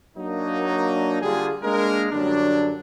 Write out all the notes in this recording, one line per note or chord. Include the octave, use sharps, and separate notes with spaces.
F#3 A#3 D4 D#4
D3 G3 F4 G4 G#4
G#3 A#3 D4 A#4
F#2 D3 F#3 G3 D4